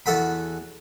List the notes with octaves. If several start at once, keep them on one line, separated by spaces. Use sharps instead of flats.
E2 F#4 A4 F#5 B5